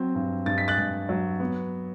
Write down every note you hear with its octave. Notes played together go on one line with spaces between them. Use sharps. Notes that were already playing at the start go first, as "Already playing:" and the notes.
Already playing: F#3 C4
G2
G2 A6
B6
F#6 A6
G2
F#3
B3